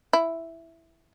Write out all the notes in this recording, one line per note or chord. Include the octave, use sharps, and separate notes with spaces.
E4